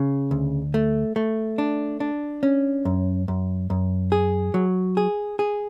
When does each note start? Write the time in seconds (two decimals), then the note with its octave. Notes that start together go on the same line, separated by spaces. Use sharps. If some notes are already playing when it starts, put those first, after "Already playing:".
Already playing: C#3
0.31 D2
0.74 A3
1.16 A3
1.58 D4
2.00 D4
2.43 C#4
2.85 F#2
3.28 F#2
3.70 F#2
4.12 G#4
4.54 F#3
4.97 G#4
5.39 G#4